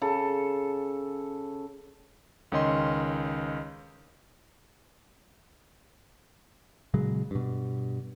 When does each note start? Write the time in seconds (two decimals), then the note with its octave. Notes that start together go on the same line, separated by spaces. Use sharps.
0.01 C#3 A4
2.52 C#2 D#3 C#4 D#5 C6
6.94 A#2 C#3 F#3 G#3
7.31 G2 B2